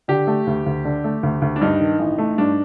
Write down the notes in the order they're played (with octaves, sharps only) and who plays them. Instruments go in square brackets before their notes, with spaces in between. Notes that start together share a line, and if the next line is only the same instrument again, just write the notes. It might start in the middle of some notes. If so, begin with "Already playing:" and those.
[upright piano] D3 [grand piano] G4
[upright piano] A3
D2
D2
D3
A3
D2
D2
[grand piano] D4
[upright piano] G2 [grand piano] D#4
[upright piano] D#3
A1
A3
[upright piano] G2 [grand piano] D4